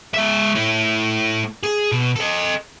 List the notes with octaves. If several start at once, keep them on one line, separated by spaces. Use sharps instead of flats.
G#3 E5
A3 E4
G#4
B2
A4 D#5